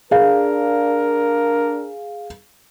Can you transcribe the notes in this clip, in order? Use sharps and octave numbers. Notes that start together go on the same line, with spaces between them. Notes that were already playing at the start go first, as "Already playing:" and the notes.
D4 G#4 A#4 F5